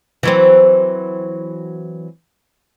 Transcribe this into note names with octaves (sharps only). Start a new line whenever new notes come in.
E3 F#3 C4